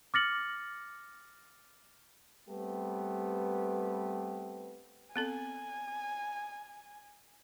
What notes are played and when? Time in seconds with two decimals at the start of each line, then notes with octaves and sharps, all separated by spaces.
0.14 D6 F6 A6 A#6 C#7 F#7
2.48 G3 A3 B3 C4 G4 B4
5.16 B3 C4 A4 G#5